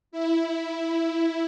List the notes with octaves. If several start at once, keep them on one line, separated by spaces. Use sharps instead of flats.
E4